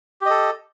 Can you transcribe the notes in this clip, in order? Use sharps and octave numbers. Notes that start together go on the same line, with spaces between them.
G4 A4 D#5